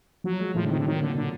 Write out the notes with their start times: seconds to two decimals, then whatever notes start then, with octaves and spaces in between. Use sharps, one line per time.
0.24 F3 F#3
0.40 G#3
0.55 A2 F3
0.65 D3
0.70 D#3 C4
0.78 D3
0.86 D#3 F#3
1.01 D3 A#3
1.16 A#2 D3